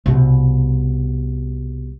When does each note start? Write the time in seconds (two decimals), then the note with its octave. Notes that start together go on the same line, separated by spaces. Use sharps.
0.06 C2 B2